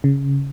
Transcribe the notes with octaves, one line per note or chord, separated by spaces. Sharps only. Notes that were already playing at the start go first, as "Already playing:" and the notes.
C#3